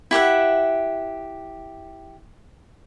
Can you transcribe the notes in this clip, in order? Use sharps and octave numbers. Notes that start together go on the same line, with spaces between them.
E4 G4 E5 F#5